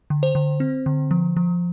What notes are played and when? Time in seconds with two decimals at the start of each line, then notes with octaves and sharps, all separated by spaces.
0.10 D3
0.23 C5
0.35 D3
0.60 C4
0.86 D3
1.11 F3
1.37 F3